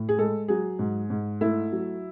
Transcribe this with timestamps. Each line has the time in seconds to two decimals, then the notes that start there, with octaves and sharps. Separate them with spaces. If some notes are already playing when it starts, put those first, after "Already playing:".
Already playing: A2
0.09 G#4
0.18 G#3 A4
0.48 F#3 G#4
0.79 G#2
1.10 G#2
1.41 A3 E4
1.72 F#3